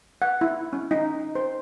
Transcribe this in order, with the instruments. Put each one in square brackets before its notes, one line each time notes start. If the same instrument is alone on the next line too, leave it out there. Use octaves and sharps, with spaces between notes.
[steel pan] F#5
E4
C#4
D#4
C5